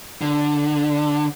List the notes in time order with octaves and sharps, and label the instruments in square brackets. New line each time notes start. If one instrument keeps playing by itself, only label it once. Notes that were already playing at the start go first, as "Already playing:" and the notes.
[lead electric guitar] D3